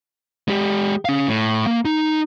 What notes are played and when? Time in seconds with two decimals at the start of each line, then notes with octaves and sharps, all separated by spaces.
0.48 G#3 G4
1.05 C#4 F5
1.28 A2
1.67 A#3
1.85 D#4